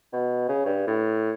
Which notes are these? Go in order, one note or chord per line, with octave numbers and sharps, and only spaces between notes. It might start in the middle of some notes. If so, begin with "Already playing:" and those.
B2
C#3
G2
A2